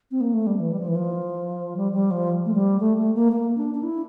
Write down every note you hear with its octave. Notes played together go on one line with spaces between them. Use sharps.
C4
A#3
A3
G3
E3
G3
F3
E3
F3
G3
G3
F3
A3
G3
A3
A3
A#3
A#3
D4
D4
E4